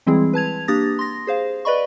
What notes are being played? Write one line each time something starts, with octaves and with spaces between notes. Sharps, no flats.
E3 G3 G#3 C4 E4 G#4
B4 A5 G#6 F7
A#3 D4 G4 D#6 A6 A#6
C6 A#6
G#4 C5 F5
B4 D5 D#5 B5 C#6